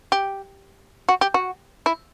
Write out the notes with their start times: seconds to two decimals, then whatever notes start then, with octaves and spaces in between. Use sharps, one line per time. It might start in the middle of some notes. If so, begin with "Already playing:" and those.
0.12 G4
1.09 F#4
1.21 G4
1.34 F#4
1.86 E4